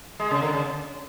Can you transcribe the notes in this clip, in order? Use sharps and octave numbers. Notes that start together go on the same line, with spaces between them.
G#3
C#3
D3
C#3